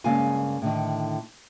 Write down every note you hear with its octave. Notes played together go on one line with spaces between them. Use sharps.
G2 C#3 G#3 A#3 F5 G#5
A2 D3 D#3